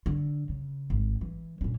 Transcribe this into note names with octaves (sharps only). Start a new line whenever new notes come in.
D3
C#3
G#1
E3
A#2 C#4